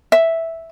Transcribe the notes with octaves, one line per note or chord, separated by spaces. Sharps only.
E5